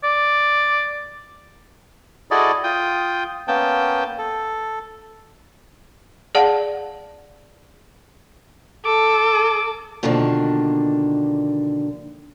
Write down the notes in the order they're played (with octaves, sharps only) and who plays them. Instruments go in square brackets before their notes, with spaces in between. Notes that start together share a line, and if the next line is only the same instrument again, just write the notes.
[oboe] D5
[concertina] E4 F#4 G#4 A4 D5 D#5
F4 G5 D#6
A#3 B3 C#4 G5 A5
A4
[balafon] G#4 D5 F5 F#5 A5
[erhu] A4 [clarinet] D6
[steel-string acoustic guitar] B2 D3 D#3 F3 A#3 D4